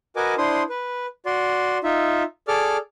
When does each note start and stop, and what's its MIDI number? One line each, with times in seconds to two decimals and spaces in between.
0.16 0.35 66
0.16 0.35 70
0.16 0.35 71
0.16 0.35 75
0.16 0.35 80
0.16 0.35 86
0.38 0.63 62
0.38 0.63 64
0.38 0.63 72
0.38 0.63 84
0.38 0.63 87
0.69 1.06 71
1.26 1.78 66
1.26 1.78 74
1.26 1.78 84
1.84 2.23 63
1.84 2.23 65
1.84 2.23 76
2.48 2.77 68
2.48 2.77 69
2.48 2.77 74
2.48 2.77 86
2.48 2.77 89